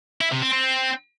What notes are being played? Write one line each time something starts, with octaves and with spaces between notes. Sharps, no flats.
E4
C3
C4
C4